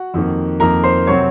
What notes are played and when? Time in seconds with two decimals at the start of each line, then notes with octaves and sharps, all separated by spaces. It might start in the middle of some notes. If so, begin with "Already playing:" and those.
Already playing: F#4 F#5
0.14 F2 D#3 A#3
0.60 F2 D#3 A#3 A#4 A#5
0.84 C5 C6
1.07 C3 F#3 C4 C#5 C#6